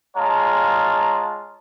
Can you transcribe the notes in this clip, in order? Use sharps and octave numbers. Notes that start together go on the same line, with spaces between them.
G#3 F4 C#5 F5 A5 A#5